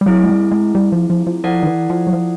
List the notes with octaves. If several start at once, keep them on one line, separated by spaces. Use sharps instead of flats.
G3
F#3 A3 C4 E4 G#4
G#3
G3
G#3
G3
F3
F3
F3
F3 E4 A4 D5 F#5
D#3
E3
F3
F#3
F3